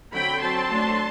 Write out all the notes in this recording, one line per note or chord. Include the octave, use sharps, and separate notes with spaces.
D3 F#3 C4 G5 B5
F#3 C4 A5 C6
F#3 A3 D4